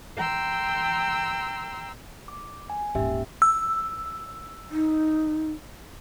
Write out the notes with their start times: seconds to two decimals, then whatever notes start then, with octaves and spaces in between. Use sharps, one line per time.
0.17 G5 A#5 C6 E6
2.28 D6
2.70 G#5
2.95 D#1 G#2 C#4 G4 E5
3.42 E6
4.71 D#4